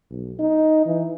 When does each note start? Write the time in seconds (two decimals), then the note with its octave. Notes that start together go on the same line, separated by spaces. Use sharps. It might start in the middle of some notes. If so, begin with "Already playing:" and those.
0.10 B1
0.39 D#4
0.86 E3